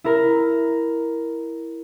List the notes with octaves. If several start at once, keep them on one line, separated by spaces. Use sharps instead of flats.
E4 A#4